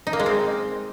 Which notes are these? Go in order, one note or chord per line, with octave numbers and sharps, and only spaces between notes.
D#4
A#3
G#3
C4